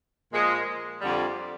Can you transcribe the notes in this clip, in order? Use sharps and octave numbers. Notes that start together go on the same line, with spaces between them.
A#2 F3 G#3
F2 D3 G3